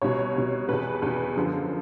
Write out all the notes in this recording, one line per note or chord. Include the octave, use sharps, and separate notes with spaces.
C2 B2 C#5
C2 B2
E2 B2 B4
E2 B2
F#2 D3 F3